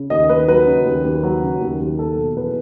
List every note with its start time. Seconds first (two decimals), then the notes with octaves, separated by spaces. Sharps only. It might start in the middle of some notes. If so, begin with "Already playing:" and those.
Already playing: C#3
0.10 D#2 D#5
0.29 D#2 B4
0.48 F#3 B4
0.66 C#3
0.85 D#2
1.05 D#2
1.23 F#3
1.43 C#3
1.61 D#2
1.80 D#2
1.99 F#3 A4
2.17 B2
2.36 E2 B4